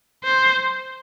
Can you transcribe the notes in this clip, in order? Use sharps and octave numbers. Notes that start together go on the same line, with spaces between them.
C5